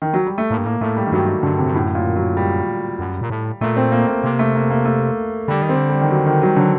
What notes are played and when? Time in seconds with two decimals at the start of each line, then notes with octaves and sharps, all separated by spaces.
0.02 D#3
0.14 F#3
0.27 G3
0.38 A3
0.51 A2 A#3
0.58 G2
0.65 A2 A#3
0.81 A2 A3
0.97 G3
1.07 D#3
1.12 G2 F#3
1.27 D#3
1.43 G2 D3
1.59 C3
1.66 G2
1.74 F#2 A2
1.95 A#2
2.16 F#3
2.37 G3
2.99 F#2
3.21 A#2
3.30 A2
3.61 A#2 A3
3.77 C4
3.92 A#3
4.07 A#3
4.23 C3 A#3
4.39 A3
4.55 A#3
4.70 A#3
4.85 A3
5.48 D3 G3
5.62 D#3
5.69 C4
5.76 D3
5.90 G3
6.01 D#3
6.11 F#3
6.26 D#3
6.42 F#3 G3
6.56 D3 F#3